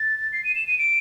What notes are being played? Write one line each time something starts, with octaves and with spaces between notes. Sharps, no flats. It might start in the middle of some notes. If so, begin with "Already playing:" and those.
Already playing: A6
C7
D#7
E7
D#7
D7